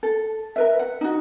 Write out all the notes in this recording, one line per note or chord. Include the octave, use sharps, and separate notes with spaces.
A4
A#4 B4 E5
F#5
D#4 F#4